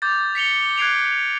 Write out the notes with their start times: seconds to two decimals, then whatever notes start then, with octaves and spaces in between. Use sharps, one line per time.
0.02 D6 G6 A6
0.35 B6 C#7 F7 G7
0.78 F#6 G#6 C7 D7 F7